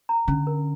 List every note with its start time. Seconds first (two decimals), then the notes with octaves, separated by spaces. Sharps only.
0.09 A#5
0.28 D3 C#4
0.47 A#4